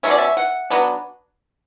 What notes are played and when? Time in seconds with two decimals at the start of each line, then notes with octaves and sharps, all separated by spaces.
0.03 A3 C#4 E5
0.08 B2 D5
0.18 E5
0.37 F#5
0.70 F#3 B3 D4